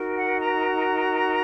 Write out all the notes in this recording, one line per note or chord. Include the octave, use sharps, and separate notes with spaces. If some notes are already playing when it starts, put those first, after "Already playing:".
Already playing: D#4 F#4 A#4
F#5
A#5